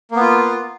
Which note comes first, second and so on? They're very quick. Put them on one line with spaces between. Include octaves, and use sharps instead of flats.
A#3 B3 F4